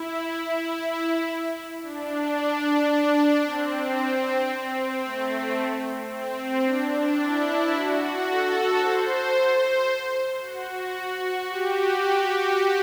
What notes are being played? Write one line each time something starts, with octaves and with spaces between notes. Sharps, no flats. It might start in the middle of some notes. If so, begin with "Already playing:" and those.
Already playing: E4
D4
D4
C4
C4
A3
C4
D4
E4
F#4
A4
C5
F#4
G4